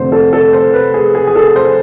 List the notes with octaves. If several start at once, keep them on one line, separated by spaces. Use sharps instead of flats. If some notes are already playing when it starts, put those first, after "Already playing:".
Already playing: F1 F2 D3 A3 C5
A4
A4
C5
B4
G#4
G#4
G#4
A4
C5